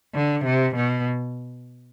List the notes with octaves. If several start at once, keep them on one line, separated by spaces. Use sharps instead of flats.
D3
C3
B2